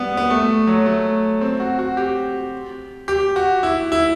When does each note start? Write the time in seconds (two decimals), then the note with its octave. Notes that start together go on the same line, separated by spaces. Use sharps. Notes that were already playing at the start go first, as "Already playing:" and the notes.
Already playing: G3 B3
0.17 B3
0.30 A3
0.67 F#3
0.86 A3
1.41 C4
1.60 F#4
1.79 F#4
1.97 G4
3.08 G4
3.36 F#4
3.63 E4
3.92 E4